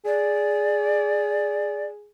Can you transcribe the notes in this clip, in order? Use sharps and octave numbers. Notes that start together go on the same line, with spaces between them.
G#4 D5